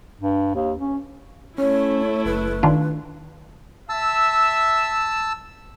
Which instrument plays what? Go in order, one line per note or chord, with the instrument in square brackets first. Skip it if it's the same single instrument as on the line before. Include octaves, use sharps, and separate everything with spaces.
[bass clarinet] G2
D#2
C#4
[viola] A3 E4 [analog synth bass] C#4 [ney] C#5
[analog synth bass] F#1 [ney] B4
[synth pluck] D#3 D4 F4
[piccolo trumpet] E5 [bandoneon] A5 E6